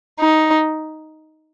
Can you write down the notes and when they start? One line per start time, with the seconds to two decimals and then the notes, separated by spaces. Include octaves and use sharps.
0.20 D#4